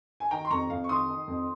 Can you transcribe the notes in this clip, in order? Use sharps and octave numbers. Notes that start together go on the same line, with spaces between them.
G#5
D#3 G5 A#5
C6
F2 A#5 C#6
F2 F5
C#6
D#3 C6 D#6
D#3
F2